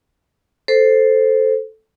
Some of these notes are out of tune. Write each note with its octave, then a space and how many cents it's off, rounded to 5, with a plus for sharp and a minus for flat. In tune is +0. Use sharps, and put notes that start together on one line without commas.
A4 +0 C5 +0